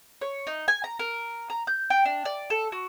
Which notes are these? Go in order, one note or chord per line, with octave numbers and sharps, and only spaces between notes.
C#5
D#4
G#5
A#5
A#4
A#5
G6
G5
D4
D5
A4
F#4